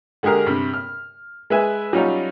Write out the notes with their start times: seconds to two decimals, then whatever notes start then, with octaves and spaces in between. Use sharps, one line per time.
0.23 D3 G#3 G4 G#4 A#4
0.46 G2 C3
0.74 F6
1.50 G#3 B4 E5 G#5
1.93 F#3 G3 C#4 D#4 F4